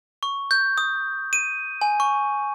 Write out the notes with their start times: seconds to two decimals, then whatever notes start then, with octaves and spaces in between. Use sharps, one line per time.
0.23 C#6
0.51 G6
0.78 D#6
1.33 D#7
1.81 G#5
2.00 C#6